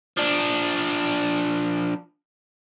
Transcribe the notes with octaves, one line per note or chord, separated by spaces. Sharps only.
F3 D4